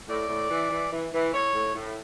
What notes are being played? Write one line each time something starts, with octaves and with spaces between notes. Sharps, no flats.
A2 D5
A2
E3
E3
E3
E3
A2 C#5
A2
A2